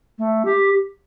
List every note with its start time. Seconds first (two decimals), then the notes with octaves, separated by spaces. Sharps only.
0.18 A3
0.45 G4